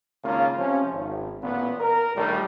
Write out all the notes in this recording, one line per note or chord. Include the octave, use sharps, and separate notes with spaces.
G#1 C#3 G#3 A#3 F4
C3 F3 C#4
G#1
A1 A#2 B3
A#4
A#1 D#2 A2 G3